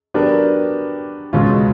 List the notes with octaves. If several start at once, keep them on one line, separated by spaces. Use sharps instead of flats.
F#3 B3 D4 G4 A#4
C#2 B2 G#3 C#4 F4